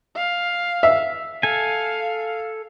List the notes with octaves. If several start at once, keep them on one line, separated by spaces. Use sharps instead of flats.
F5
E5
A4 F5 G#5